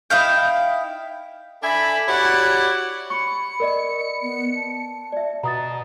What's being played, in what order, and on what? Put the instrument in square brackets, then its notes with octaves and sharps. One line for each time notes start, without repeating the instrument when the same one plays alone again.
[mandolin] D#4 E4 F5 G5
[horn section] D4 A4 E5 G#5 B5
E4 F#4 G4 C#5 D5 F#5
[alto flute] B5 [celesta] C#6 [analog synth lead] C#7
[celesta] A#4 D5 D#5
[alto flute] B3
A5
[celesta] D5 E5
[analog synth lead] B2 [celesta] A#5 D#6 A6